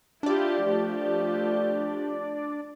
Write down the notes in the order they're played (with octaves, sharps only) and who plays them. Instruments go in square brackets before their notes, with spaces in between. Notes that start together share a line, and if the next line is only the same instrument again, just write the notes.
[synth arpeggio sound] D4 D5 [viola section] E4 F4 G4
[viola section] F3 A3 G4